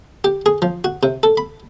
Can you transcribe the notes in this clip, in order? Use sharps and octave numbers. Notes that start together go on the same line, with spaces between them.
G4
G#4
F3
F#4
C3
A4
B5